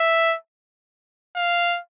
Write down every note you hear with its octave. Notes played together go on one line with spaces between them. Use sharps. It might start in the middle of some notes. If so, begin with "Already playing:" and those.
Already playing: E5
F5